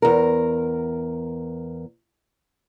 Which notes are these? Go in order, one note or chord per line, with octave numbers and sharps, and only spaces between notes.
E2 A#4